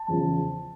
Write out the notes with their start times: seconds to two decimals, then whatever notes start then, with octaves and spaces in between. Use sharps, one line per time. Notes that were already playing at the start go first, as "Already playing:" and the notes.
Already playing: A5
0.08 E2 C#3 F3